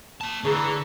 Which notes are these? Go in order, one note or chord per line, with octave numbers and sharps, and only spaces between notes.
A#3 A5
D3 E3 D4 G#4 C#5 A#5